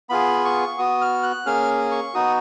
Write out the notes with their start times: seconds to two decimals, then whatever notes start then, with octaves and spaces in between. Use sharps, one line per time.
0.10 B3 F4 G#4 B5
0.45 C#6
0.78 B3 F#4 D#6
1.01 F6
1.23 F#6
1.46 A#3 C#4 G#4 F6
1.91 C#6
2.14 B3 D#4 F#4 D#6